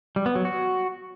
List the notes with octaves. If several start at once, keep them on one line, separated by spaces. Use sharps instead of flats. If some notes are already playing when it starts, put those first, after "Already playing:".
G3
B3
F#3
F#4